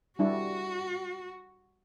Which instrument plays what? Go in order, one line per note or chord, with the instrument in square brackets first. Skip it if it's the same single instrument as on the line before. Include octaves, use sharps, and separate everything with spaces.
[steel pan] G3 D4 E4 [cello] F#4